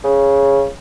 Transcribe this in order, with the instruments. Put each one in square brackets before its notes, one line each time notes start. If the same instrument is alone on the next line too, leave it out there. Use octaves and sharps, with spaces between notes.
[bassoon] C#3